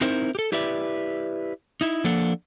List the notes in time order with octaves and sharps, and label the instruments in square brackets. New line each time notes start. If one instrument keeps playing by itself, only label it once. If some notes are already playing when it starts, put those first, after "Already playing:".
[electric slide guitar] C4 D#4 E4 A#4 C5
G4 A4
E4 G4 B4 D5 E5
D#4 E4
F3 A#3 D4 A4 F#5